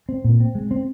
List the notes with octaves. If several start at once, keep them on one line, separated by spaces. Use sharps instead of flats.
C4
A#2
C4
G#3
C4